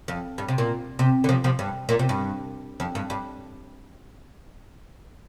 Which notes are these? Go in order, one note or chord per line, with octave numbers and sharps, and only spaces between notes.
F2
G2
C3
A#2
C3
D3
C3 F3
C3 F3
G2
A#2
C3
G2
F2
G2
G2